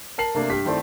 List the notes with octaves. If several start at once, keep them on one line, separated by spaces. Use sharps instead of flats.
A#4 A5 C7 F#7
C3 A3 A#3 D4
G2 G4 B6
D#3 A3 C4 E4 C5 D5